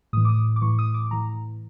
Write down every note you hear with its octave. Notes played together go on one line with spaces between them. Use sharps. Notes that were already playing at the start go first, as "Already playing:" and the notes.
A2 E3 D#6
D6
D#6
D6
A2 E3 C#6
D#6
D6
A2 E3 A#5